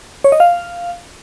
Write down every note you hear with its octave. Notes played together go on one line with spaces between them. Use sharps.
C#5
D#5
F5